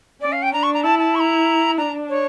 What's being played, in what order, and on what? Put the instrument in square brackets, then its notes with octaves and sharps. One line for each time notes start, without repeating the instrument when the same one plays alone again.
[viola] C#4 [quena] D5
[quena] F5
G5
[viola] D4 [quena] A#5
[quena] C#6
A#5
[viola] E4 [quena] A5
[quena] A5
C#6
A#5
[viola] D4 [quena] A#5
[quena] C#5